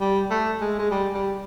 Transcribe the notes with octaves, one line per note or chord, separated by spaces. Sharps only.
G3
A3
G#3
G#3
G3
G3